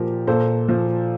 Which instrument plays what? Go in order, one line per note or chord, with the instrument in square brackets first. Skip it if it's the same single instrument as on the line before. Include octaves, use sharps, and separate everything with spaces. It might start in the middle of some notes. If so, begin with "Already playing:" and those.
Already playing: [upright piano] A#2 F3 G4 A#4
A#2 A4 C5
F3